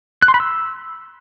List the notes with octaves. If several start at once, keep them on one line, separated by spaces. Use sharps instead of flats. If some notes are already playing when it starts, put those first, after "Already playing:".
F#6
C6
B5
E6